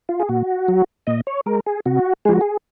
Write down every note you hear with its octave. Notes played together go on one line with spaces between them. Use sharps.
F4
G#4
A#2 F#4
F#3
A#2 D#5
C#5
G#3 A#4
G#4
C3 F#4
F3 G#3 F#4 G#4
G#4